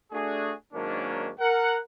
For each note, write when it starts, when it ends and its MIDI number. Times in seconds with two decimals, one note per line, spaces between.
0.12 0.53 57
0.12 0.53 62
0.12 0.53 66
0.12 0.53 68
0.73 1.31 44
0.73 1.31 51
0.73 1.31 54
0.73 1.31 58
0.73 1.31 61
0.73 1.31 62
1.40 1.79 70
1.40 1.79 78